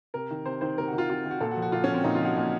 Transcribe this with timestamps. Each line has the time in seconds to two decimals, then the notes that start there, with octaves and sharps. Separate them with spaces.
0.14 C3 A#4
0.30 D#3
0.46 C3 C5
0.61 D#3 C5
0.78 C3 A#4
0.88 F#4
0.93 D#3
0.98 F4
1.09 C3 F4
1.25 D#3
1.31 F#4
1.40 A#2 A4
1.51 F#4
1.57 F3
1.62 F#4
1.72 A#2 F4
1.84 C#4
1.89 F3
1.94 C4
2.04 A#2 D#4
2.15 F4
2.21 F3 F#4
2.37 A#2